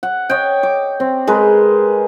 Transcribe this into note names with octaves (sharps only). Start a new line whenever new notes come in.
F#5
C#5 D#5 G5
D6
C4
G#3 A#4 B4